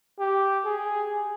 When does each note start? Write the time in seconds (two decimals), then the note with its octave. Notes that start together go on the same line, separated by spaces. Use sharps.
0.20 G4
0.65 G#4